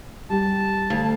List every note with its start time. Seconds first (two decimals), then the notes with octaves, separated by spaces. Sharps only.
0.30 G3 G4 A5
0.90 D2 F5